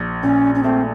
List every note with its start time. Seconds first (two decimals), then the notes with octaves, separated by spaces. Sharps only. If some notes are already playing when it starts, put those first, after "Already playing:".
Already playing: A#1
0.23 A#2 C#4
0.55 C#4
0.63 A3 C4